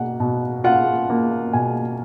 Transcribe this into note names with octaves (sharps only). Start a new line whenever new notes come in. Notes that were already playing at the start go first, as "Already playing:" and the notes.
Already playing: B2 A#3 F#5
B2
F4 F#5
A#3
B2 G#5